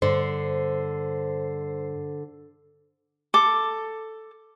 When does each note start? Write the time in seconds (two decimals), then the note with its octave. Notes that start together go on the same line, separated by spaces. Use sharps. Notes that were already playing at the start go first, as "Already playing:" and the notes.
0.02 G2 D3 C5
3.34 A4 D6